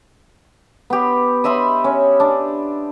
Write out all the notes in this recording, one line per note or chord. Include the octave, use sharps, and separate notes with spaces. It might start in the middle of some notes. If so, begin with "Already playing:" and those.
B3 G4
D#5 E5 B5 C6
C#4
D4